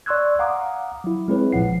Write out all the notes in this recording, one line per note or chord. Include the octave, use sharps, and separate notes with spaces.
D5 C6 C#6 E6 F#6 G#6
F5 F#5 A#5 D6 D#6
F#3 E4
G#3 C4 E4 G#4 B4 C#5
G#1 A#2 F3 F#5 C7